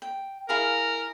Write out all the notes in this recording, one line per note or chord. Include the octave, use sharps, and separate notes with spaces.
G5
E4 G#4 A#4 F5